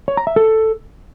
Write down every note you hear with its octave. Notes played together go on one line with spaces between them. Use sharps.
C#5
A#5
E5
A4